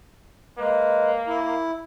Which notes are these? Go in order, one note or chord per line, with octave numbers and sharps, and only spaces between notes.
G#3 A#3 B4
E4